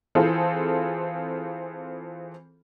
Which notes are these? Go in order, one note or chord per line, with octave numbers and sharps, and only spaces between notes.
E3 C4 F4 G#4 A4